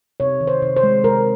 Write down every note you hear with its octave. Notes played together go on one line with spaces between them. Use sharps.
C3 C#5
D#3
C5
C3
C5
G#3
C3 A#4